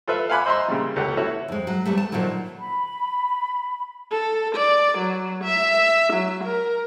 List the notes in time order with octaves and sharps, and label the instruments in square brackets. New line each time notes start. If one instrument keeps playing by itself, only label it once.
[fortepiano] F4 A4 B4 E5
F5 F#5 G#5 B5 D6 F#6
C5 D#5 E5 A#5 C6
A#2 C#3 G3
C#2 G4 A4 F#5
E4 F#4 A4 C#5
[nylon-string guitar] F2 G#3
F#3
E2 G3 A3
A5
A#2 D3 D#3 F3 F#3
[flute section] B5
[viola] A4
D5
F#3
E5
F#3
A#4